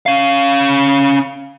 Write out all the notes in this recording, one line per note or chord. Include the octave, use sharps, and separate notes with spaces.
C#4 F5